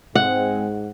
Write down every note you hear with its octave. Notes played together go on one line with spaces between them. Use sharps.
G#2 G#3 C4 F#5